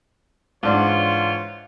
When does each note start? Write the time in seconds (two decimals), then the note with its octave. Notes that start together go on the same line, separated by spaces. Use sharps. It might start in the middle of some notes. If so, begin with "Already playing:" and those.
0.63 G#2 E3 D4 F4 C#5